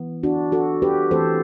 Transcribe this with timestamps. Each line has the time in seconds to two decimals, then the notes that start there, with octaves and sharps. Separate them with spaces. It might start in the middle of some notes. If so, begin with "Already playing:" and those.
Already playing: E3 B3
0.23 D4 F#4
0.52 F#4 A4
0.82 G4 B4
1.11 E3 A3 C4 A4 C5